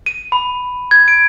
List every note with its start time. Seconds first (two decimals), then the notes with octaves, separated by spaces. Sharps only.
0.06 D#7
0.32 B5
0.91 G#6
1.08 D7